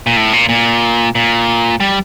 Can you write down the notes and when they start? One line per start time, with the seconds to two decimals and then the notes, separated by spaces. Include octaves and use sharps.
0.07 A#2
0.16 A2
0.33 A#2
0.49 A#2
1.15 A#2
1.80 G3